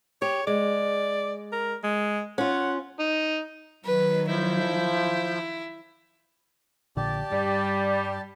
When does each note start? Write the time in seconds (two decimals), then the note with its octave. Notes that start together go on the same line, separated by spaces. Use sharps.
0.22 G4 C#5
0.47 G#3 D5
1.52 A#4
1.83 G#3
2.38 C#4 F4 F#5
2.99 D#4
3.85 D#3 F#3 B4
4.29 F3 E4 G6
6.97 A#1 A#2 D3 G4 D5 A5
7.31 G2 G3